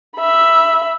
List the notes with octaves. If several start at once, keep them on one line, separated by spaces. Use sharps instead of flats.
E5 B5